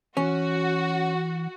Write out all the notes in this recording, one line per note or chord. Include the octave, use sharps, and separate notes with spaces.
E3 C#4 F#4